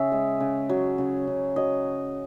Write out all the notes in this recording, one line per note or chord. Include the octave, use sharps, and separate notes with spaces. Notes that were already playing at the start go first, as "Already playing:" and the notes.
Already playing: C#3 G#4 E5
G#3
C#3
F#3
C#3
C#3
F#3 D#5